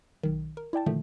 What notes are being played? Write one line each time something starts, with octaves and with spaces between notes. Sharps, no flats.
B1 D#3
A#4
E4 D5 G5 A5
A#2 D3 D#3 F3 A3